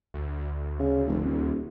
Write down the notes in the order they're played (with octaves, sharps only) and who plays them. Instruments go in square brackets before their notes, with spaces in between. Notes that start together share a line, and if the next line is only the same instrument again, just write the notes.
[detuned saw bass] D2
[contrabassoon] C#3
F1
D#1